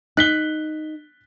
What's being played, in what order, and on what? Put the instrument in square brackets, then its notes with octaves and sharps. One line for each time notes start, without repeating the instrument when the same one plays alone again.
[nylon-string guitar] D#4 [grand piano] F#6 B6 G7